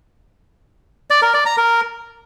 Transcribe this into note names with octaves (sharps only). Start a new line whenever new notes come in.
D5
A#4
D5
A#5
A#4